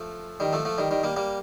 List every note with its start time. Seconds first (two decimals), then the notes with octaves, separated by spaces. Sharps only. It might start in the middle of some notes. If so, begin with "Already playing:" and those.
Already playing: F3 A3
0.40 D#3 G3
0.53 F3 A3
0.65 F3 A3
0.78 D#3 G3
0.91 D#3 G3
1.03 G3 A#3
1.17 G3 A#3